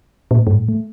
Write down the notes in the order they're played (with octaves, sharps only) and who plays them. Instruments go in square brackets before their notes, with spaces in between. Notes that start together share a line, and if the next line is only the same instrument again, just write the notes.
[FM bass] A#2
A2
G2
A2
A3